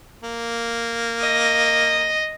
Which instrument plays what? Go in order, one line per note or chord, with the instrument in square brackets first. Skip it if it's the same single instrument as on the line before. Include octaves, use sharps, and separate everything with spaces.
[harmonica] A#3
[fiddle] D#5